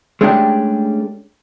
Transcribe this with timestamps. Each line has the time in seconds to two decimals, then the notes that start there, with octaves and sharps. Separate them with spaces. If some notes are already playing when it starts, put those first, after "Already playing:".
0.21 G#3 A3 C#4 D4 G4